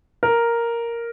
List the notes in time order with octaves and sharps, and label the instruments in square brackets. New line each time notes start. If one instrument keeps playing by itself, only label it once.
[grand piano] A#4